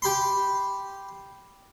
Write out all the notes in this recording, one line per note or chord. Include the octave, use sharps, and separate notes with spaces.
G4 B5 C6